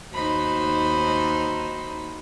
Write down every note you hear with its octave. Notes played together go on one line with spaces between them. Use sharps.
D#2 D#4 F#4 C5 B5